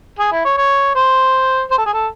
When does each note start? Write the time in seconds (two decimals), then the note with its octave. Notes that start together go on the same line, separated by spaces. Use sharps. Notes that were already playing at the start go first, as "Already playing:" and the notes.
0.19 G#4
0.32 E4
0.45 C#5
0.57 C#5
0.95 C5
1.71 C5
1.78 A4
1.86 G#4
1.93 A4